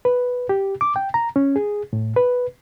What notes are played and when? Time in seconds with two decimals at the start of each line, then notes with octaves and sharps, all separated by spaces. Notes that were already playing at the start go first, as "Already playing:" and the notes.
0.05 B4
0.49 G4
0.81 D6
0.96 G5
1.14 A#5
1.36 C#4
1.56 G#4
1.93 A2
2.16 B4